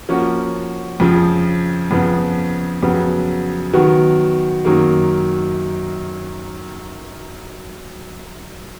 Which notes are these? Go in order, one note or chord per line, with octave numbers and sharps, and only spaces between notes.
F3 A#3 C#4 F#4
F2 C#3 F3
F2 C#3 F3 B3
F2 C#3 F#3 B3
D#3 F#3 B3 F#4
F#2 D#3 F#3 A#3